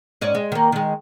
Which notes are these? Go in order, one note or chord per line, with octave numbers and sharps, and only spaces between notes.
G#2 C#4 D5
G#3
D#3 A#3
D#3 G#3